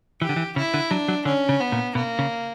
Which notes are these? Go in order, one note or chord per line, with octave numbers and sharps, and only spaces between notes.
E3 G4
D3
E3
C#3 E4
D3
F#3 D4
F#3
D3 C#4
C#3
B3
A#2
B2 A#3
C#3